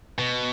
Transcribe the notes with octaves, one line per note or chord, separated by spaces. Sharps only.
B2